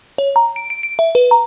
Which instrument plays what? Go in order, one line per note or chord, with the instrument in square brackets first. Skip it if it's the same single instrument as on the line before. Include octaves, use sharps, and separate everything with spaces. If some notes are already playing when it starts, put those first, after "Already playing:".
[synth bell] C#5
A#5
D7
D7
D7
E5
B4
A#5